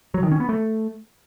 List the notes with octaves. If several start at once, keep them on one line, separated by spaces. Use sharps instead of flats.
F#3
D#3
C#4
B3
A3